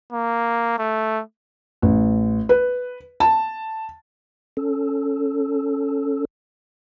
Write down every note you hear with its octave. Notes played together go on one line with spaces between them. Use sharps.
A#3
A3
A1
B4
A5
C#4 A4